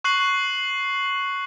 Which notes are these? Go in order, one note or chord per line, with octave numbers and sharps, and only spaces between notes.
C#6 F#6 C7 F#7